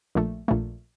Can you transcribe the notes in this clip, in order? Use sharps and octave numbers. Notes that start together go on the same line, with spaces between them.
A#1 A#2 A3
A#1 A#2 A3